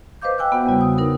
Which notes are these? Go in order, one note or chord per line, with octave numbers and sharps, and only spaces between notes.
B4 C5 D#5 F5 D6 G6
G5 G#5 E6 F#6
B3 F#4 F#5
E2 C#3 G3
D#6
D#4 A#4 B4